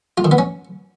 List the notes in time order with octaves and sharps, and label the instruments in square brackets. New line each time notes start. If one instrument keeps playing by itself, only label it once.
[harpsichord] F4
D#3
B3
C#4